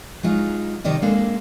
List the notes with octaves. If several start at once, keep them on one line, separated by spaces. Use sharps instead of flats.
F#3 G#3 D#4 F4
C3 D#3 G3 D5 D#5
G#3 A#3 C4 D4 A4 F5